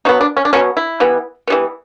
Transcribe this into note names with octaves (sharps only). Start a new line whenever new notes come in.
B2 F#3 B3 D#4
D4
C#4
D4
B2 F#3 B3 C#4
E4
E3 G3 B3
E3 G3 B3